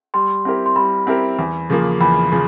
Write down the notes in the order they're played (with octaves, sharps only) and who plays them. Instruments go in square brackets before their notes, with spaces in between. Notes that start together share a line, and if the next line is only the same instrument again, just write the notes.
[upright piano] G3 [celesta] C6
[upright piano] C4 E4 G4 A#4
[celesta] C6
[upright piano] G3 [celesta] B5
[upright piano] C4 E4 G4 A#4
E2
C#3 F3 A#3
[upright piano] E2 [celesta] B5
[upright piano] C#3 F3